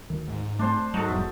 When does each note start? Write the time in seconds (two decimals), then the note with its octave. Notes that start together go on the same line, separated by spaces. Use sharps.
0.10 D2 D#3
0.28 G#2
0.59 A3 C4 D4 C5 A5
0.94 G#2 F#3 D#4 F#4 A4
1.08 D#1 E2 E5